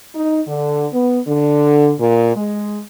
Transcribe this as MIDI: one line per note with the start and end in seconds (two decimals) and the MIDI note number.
0.15 0.40 63
0.47 0.87 50
0.92 1.19 59
1.27 1.92 50
1.98 2.35 46
2.35 2.81 56